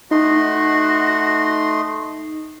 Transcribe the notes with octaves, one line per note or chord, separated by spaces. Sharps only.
A3 D#4 F#4 D#5 C6